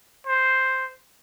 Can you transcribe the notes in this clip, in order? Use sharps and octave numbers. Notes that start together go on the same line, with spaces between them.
C5